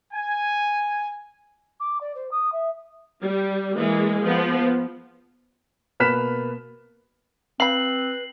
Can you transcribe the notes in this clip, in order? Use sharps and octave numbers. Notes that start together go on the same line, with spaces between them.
G#5
D6
D5
C5
D#6
E5
G3
E3 G#3 A#3
F3 B3
B2 A#3 B4 F6 B6 E7
C4 B4 F5 B5 C7 F#7